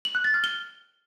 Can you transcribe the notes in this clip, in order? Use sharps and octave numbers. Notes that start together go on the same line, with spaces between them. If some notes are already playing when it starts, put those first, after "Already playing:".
F#7
F#6
A6
F6
G7